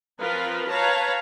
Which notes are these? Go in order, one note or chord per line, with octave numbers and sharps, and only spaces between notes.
F3 C4 F4 A#4 B4
B4 C#5 F5 A5 A#5